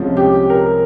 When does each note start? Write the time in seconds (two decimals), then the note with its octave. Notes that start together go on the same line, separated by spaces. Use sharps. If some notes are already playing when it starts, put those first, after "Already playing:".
Already playing: C2 C3 F3 G#3 C#4
0.17 G4
0.50 A#4